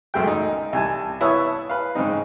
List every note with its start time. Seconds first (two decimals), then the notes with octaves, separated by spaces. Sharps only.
0.14 C#2 F#2 A3 G#4 G5
0.27 D#4
0.73 C2 G#5 A5
1.21 E4 B4 C#5 E5 A5 D#6
1.69 B4 F5
1.95 G#2 C#3 C4 D#4